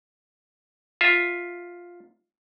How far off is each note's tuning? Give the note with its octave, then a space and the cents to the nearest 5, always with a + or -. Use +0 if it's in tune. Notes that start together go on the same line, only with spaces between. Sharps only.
F4 +5 E5 +0